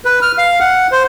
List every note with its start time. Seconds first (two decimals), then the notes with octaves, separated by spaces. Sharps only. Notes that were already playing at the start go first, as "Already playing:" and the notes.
0.05 B4
0.22 F6
0.38 F5
0.60 F#5
0.92 C5